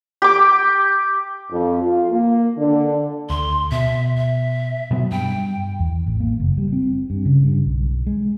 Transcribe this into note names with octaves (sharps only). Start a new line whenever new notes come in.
G4 D6
F2
F4
A#3
D3
D2 C6
B2 E5
E5
B2 F#3 B3
G2 G5
E2
A1
A#3
F#1
G3
C4
G2
C#3
G2
B1
G#3